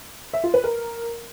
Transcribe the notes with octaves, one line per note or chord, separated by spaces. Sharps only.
E5
F4
B4
A#4